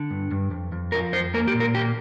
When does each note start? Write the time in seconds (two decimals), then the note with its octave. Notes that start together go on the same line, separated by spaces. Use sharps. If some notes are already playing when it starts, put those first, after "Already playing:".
Already playing: D3
0.10 G2
0.31 G2
0.51 F2
0.72 F2
0.92 F3 A#4
1.13 F2 C5
1.34 A#3 A#4
1.47 G4
1.54 A#2
1.60 A#4
1.75 A#3 G4